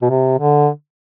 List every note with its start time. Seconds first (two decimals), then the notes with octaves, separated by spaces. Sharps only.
0.02 B2
0.10 C3
0.39 D3